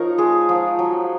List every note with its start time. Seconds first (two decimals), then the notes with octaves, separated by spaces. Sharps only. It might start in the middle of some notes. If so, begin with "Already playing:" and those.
Already playing: F3 D#4 A#4 C#5
0.18 G#3 G#4
0.49 F3
0.79 F#3